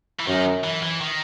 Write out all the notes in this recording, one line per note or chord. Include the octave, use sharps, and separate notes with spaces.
E3
F#2 D#3
E3
E3
D#3